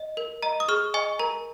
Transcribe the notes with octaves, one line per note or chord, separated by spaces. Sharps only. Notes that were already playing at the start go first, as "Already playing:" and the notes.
Already playing: D#5
A#4
D#5 A#5
D#6
G#4 C#6 F6
D#5 G#5 C#6
A#4 A#5